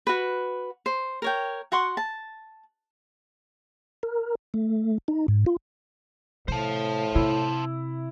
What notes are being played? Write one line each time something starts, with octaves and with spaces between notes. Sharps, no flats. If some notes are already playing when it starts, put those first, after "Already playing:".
F#4 B4
C5
A#4 C#5 G5
F#4 F#5 C6 C#6
A5
A#4
A3
D#4
G#2
F4
A2 C3 C5 A5
C3 E4